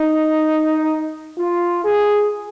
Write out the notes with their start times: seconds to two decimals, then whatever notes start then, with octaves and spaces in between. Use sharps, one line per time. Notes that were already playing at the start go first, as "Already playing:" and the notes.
Already playing: D#4
1.38 F4
1.84 G#4